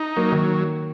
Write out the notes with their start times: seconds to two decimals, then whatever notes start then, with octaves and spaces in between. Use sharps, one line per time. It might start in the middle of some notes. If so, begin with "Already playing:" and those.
Already playing: D#4
0.17 F#3 A#3
0.32 D#3